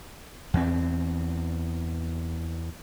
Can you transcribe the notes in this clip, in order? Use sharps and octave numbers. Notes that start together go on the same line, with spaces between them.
E2 C4